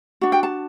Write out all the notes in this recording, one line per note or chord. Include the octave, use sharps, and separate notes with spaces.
D4 F#4
G5
A5